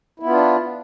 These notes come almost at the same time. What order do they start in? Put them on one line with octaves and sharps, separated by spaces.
E4 B3 F4 D4